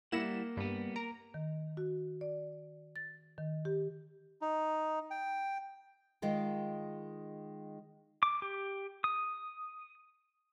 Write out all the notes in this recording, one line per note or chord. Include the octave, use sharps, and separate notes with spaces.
G3 A#3 E4 F#5 A#6 C#7 E7
G2 G3 B3
A#4 A#5
D#3
F#4
D5
A6
D#3
G4
D#4
G5
D#3 G#3 F4 A#4
D6
G4
D#6